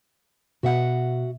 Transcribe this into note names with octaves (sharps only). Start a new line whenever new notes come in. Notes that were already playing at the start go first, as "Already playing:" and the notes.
B2 F#4 E5 F#5